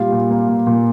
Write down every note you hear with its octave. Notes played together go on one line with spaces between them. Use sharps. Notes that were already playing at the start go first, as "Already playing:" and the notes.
Already playing: A#2 G3 F4
A#2
A#3
A#2
A#2